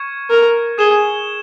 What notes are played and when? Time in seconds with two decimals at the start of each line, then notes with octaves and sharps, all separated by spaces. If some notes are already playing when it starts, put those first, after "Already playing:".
Already playing: C#6 F6 G#6 C#7 E7
0.30 A#4
0.78 G#4 G#6 E7 G7